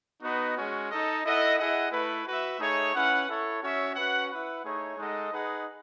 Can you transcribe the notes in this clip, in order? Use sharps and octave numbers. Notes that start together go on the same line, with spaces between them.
B3 D#4 F#4 B4 D#5
G#3 C#4 F#4
D#4 A4 D#5
E4 A4 D#5 F#5
E4 G#4 D#5 F#5
A3 E4 B4
F#4 B4 E5
A3 D#4 G#4 C#5
C#4 E4 B4 F#5
E4 A4 C#5
C#4 F#4 C#5 E5
C#4 F#4 B4 F#5
E4 B4 F#5
A3 D#4 G#4 C#5
G#3 D#4 A4 D#5 F#5
D#4 G#4 B4 D#5 F#5